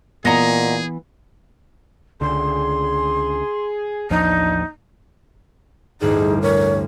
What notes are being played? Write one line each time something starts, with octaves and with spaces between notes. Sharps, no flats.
A#2 E3 B3 G#4 D#5 F#5 A#5
C#2 D3 G#4 C6
A1 D#2 F3 D4 D#4
A1 D2 G2 D#4 G#4
A#4 C#5